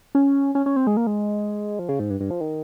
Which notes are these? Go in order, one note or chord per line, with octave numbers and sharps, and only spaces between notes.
C#4
C#4
C#4
C4
G#3
A#3
G#3
F3
C#3
G#2
G2
G2
F3
D#3